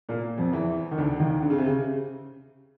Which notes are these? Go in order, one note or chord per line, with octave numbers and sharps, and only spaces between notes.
A#2 A#3
F2 F3
E2 E3
D#3
D2 D3
D#2 D#3
D3
C#3
C3
C#3